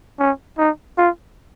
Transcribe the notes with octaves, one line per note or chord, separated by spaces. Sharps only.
C#4
D#4
F4